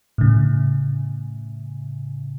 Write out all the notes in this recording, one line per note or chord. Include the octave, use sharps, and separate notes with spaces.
A2 C#3